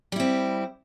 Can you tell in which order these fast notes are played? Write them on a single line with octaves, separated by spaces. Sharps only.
G3 E4 C4